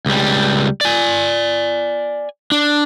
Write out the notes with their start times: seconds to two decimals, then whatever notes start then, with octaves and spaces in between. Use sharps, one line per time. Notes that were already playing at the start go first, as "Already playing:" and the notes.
0.06 C#2 G3
0.81 D5 G#5
2.52 D4